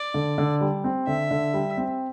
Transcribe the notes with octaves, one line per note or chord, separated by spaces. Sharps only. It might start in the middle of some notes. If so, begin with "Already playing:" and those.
Already playing: D5
D3
D3
G3
C4
D3 E5
D3
G3
C4